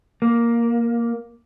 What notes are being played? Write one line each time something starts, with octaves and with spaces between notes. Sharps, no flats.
A#3